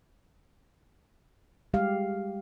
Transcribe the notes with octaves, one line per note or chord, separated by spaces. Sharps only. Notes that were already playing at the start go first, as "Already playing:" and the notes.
G3 G#3 G4 F5